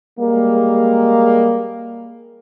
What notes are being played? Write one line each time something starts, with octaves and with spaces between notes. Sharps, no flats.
G3 G#3 A#3